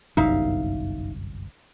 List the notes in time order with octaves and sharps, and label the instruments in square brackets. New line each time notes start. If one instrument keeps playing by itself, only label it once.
[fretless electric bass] G1 C2 F#2 [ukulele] D#4 E5 F5